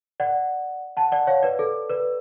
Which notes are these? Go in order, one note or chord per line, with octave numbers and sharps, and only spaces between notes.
D5 F#5
F#5 A5
D5 F#5
C#5 F5
B4 D5
A4
B4 D5